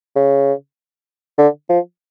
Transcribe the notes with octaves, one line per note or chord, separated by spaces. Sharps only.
C#3
D3
F3